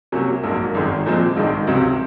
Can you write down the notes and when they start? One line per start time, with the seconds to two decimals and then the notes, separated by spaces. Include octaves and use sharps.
0.12 C2 C3 F#3 A#3 C#4
0.43 A#1 G#2 F#3 A#3
0.74 G#1 F#2 D#3 G#3
1.06 A#2 F3 G#3 C4
1.36 A#1 G#2 D#3 G#3
1.67 C#2 C3 F#3 C4